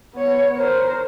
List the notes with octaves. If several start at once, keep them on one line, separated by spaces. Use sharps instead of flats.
B3 C#5
A#4 C5